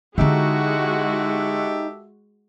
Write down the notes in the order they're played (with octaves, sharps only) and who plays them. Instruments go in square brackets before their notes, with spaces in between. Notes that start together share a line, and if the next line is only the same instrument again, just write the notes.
[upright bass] D3 E4 [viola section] G#3 F#4 [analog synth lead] D#4 [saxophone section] G4 A4 E5